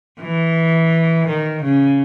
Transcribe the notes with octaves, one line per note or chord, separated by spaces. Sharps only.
E3
D#3
C#3